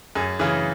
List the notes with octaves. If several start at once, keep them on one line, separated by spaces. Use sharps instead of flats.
F#2 G#4
C#3 E3 G#4